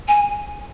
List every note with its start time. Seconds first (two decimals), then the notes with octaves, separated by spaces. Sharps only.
0.08 G#5